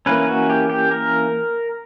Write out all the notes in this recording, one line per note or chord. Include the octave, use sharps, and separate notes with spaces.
E3 A#3 C#4 B4
F#4
G4
G4
A#4